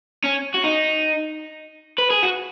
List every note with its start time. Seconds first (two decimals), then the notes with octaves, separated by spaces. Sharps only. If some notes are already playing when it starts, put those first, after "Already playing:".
0.24 C#4
0.54 F#4
0.64 D#4
1.98 B4
2.10 G#4
2.23 F#4